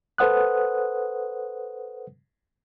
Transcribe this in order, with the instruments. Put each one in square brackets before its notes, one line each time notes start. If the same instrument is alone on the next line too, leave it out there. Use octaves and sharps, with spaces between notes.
[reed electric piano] A4 B4 C5 F#5 D#6 F#6